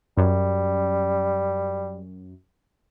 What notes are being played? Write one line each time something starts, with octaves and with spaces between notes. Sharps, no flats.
F#2 G3